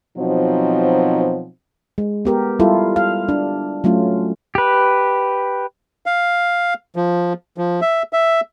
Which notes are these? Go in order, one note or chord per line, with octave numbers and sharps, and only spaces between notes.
B2 F3 F#3 C4 D#4
G#3
B3 G4 A#4
G3 E4 F4 A4
F5
D4
F#3 A3 C#4 F4
G4 B4
F5
F3
F3
E5
E5